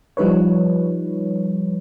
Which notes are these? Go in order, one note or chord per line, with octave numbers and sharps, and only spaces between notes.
F3 G3 D#4 B4 C#5